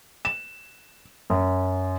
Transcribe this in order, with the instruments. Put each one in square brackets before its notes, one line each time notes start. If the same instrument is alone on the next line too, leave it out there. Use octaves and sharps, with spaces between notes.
[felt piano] E7
F#2